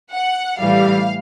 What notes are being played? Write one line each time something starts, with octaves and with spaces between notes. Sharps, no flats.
F#5
A2 E3 G3 F5